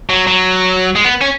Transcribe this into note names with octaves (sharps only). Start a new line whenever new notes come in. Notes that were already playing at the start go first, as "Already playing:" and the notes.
F#3
F#3
G#3
B3
C#4